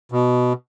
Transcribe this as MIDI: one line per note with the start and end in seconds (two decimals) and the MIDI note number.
0.12 0.53 47